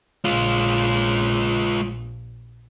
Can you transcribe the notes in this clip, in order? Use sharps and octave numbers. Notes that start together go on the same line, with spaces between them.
A#1 G#3 F4